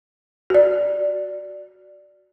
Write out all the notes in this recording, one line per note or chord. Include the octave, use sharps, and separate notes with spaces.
F#4 D5